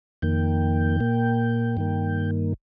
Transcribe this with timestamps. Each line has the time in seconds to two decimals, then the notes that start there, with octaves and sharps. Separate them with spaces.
0.22 F2 D#3 A#3 G5
1.00 A#2 A#3
1.77 G2 D#3 A#3